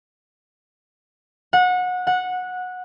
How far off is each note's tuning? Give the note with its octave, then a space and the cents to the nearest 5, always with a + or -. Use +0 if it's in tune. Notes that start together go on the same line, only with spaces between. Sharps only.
F#5 -25
F#5 -15